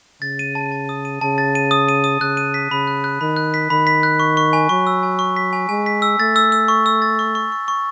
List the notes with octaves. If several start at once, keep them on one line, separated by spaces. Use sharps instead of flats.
C#3 A6
D#7
A5
A5
D#6
D#7
C#3 A5
A6
D#7
D#6
D#7
D#6
C#3 F#6
D#7
B6
C#3 B5
F#6
F#6
D#3 B5
F#6
B6
D#3 B5
B6
F#6
C#6
C#6
G#5
F#3 C#6
E6
G#5
C#6
B6
G#5
G#3 G#5
B6
E6
A3 A6
E6
E6
C#6
E6
A6
C#6
C#6
C#6
C#6